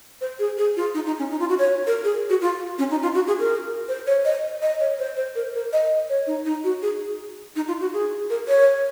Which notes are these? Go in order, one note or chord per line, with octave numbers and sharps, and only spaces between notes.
C5
G#4
G#4
F4
D#4
D#4
C#4
D#4
F4
F#4
C#5
A#4
G#4
F#4
F4
C#4
D#4
F4
F#4
G#4
A#4
C5
C#5
D#5
D#5
C#5
C5
C5
A#4
A#4
D#5
C#5
D#4
D#4
F#4
G#4
D#4
F4
F#4
G#4
A#4
C#5